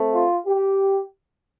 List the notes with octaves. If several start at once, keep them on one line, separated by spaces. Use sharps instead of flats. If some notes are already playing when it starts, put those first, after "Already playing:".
Already playing: A3 C4
F4
G4